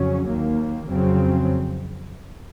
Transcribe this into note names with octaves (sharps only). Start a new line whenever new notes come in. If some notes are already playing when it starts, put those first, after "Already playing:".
Already playing: F2 C#3 F#3 C#4
D#2 D#3 A#3
F2 C#3 F#3 C4